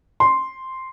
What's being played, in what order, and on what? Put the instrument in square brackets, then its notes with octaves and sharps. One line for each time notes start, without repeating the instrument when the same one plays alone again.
[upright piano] C6